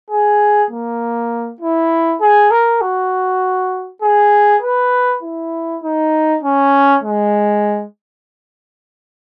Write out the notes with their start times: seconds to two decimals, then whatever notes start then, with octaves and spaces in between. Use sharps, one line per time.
0.11 G#4
0.71 A#3
1.61 E4
2.21 G#4
2.51 A#4
2.81 F#4
4.02 G#4
4.62 B4
5.23 E4
5.83 D#4
6.43 C#4
7.04 G#3